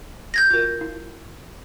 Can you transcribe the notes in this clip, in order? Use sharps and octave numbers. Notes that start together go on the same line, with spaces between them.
G6 G#6 A#6
F4 F#4 A#4
E4